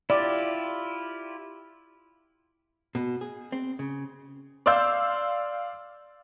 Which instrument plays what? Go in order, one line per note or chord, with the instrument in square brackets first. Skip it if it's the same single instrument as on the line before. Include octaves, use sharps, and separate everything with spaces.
[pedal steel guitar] E4 F4 G4 [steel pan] D5
[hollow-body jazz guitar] B2
G#4
C4
C#3
[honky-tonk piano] D5 F5 C6 E6 G6